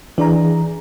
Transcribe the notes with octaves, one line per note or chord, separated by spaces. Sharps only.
E3 D4 G#4 D5 A#5